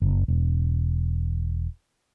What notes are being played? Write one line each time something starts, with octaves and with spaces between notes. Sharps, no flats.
F#1
E1